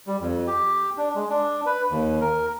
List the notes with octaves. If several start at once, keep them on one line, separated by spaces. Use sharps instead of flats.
G3
F2
G4
D4
G#3
D4
B4
D#2
A#4